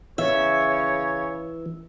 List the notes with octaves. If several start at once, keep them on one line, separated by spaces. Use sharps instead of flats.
C#3 E3 C#5 E5